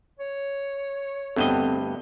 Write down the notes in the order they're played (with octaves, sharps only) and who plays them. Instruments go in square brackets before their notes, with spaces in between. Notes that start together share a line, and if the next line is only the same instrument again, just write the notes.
[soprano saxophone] C#5
[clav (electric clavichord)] D2 G2 D#5 [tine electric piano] B3 C4 A4